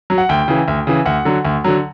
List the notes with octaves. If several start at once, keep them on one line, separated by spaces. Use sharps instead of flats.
F#3
F#5
D2 G5
C#3 E3
D2
C#3 E3
D2 F#5
D3 F#3
D2
D3 F#3